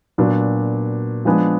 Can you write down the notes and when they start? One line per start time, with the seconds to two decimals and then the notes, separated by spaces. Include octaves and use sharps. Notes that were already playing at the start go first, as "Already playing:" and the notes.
0.18 A#2 F#3 B3 D4 F#4
1.25 F3 G#3 B3 D4 G#4